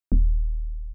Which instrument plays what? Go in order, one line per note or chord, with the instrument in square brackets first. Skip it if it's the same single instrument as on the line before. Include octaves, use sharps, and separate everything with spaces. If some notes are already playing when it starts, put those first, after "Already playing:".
[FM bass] D#1